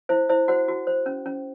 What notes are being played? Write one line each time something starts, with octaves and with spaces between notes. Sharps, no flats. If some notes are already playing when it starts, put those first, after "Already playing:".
E4 C5 E5
E4 C5 E5
F#4 C5 F#5
F#4
C5
C#4
C#4